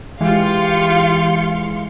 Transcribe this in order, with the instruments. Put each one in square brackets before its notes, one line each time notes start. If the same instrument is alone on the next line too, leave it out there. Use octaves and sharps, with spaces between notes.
[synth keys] E3 G#3 [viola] F4 G4 [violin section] F5 C6 C#7